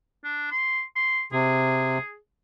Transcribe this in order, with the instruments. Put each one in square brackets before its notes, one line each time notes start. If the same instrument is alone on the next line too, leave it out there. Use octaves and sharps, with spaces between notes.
[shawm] D4
C6
C6
[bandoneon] C3 [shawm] G#4